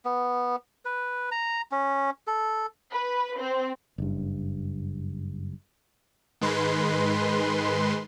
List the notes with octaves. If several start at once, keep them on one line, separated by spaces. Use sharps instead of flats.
B3
B4
A#5
C#4
A4
B4
C4
F#1 G2
G#2 D#3 G#3 B4 C6